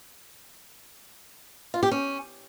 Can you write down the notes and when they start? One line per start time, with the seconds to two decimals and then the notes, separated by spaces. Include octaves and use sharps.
1.74 F4
1.83 G4
1.91 C#4